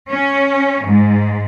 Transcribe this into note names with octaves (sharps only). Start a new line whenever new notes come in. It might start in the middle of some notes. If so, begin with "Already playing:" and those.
C#4
G#2